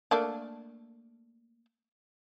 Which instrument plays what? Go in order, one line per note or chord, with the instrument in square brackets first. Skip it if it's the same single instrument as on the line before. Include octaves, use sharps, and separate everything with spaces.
[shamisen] A3 A#3 D4